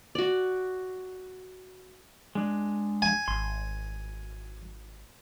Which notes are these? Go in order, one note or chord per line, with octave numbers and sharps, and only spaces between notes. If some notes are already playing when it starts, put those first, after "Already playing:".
F#4 D5
G#3 D4
G#5
G#1 C6